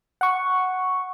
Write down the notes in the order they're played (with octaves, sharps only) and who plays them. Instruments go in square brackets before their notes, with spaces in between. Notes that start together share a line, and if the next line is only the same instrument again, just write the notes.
[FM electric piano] F#5 C#6